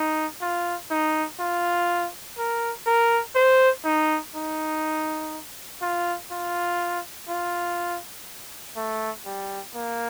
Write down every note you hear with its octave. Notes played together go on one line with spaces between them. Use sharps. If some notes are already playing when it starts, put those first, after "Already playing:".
Already playing: D#4
F4
D#4
F4
A#4
A#4
C5
D#4
D#4
F4
F4
F4
A3
G3
A#3